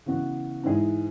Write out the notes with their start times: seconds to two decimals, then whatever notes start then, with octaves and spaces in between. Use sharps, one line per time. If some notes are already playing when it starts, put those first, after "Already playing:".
0.06 C#3 E3 B3 F#4 B4
0.63 G#2 E3 G#3 E4 G#4